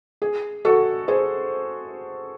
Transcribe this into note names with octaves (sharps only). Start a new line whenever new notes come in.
G#4
F#4 A4
G#4 C5